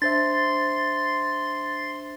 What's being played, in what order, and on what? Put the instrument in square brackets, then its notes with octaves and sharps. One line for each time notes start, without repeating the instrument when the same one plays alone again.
[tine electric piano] D4 C5 E5 [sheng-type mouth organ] C6 [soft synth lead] A6